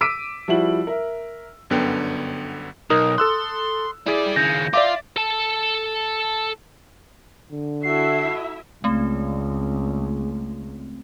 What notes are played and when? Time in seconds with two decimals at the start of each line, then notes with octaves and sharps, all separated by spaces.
0.01 D6 E6 B6 D7 D#7
0.48 F3 G3 E4 F#4 F#7
0.87 A#4 E5
1.70 G1 F#2 D3 B3 G5
2.90 B1 D#4 A#4 D#6
3.18 A4 C6 E6 F#6
4.06 G3 E4 G#4 D5
4.36 D#2 C#3 G6 A#6
4.74 F4 D5 E5 D6
5.16 A4 A5
7.51 D3
7.83 E4 F#4 A4 E5 C7
8.84 C#2 A3 C4